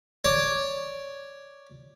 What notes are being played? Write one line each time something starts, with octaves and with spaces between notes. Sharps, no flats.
C#5 D5